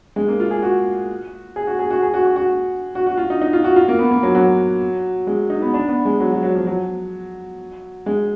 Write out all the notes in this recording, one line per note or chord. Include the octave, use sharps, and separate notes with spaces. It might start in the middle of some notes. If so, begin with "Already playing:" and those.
G#3
A#3
F4
G#4
F#4
G#4
F#4
G#4
F#4
G#4
F#4
F#4
F#4
F#4
F#4
F4
D#4
D#4
F4
F#4
F4
A#3
B3
A#3
F#3
F#3
G#3
D#4
B3
D4
B3
G#3
F#3
F#3
F#3
F3
F#3
G#3